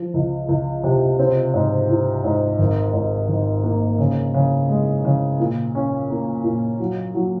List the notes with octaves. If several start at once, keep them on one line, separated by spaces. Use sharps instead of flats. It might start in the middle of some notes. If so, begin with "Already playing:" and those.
Already playing: F3
C#2
C#2
C3
C4
G#2
F4
G#2
G#1
G#2
D#3
A#3
C#3
C#3
G#3
C#3
A#2
C#4
A#3
A#2
F#3
F#3